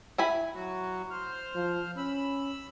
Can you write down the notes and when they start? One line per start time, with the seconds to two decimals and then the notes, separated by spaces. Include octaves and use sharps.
0.18 E4 G#5 B5
0.54 F#3 F#4
1.11 C5 F6
1.55 F3
1.97 C#4 B5 E6